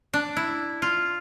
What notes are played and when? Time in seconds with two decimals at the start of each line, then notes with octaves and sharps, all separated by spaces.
0.14 D4
0.37 E4
0.82 F4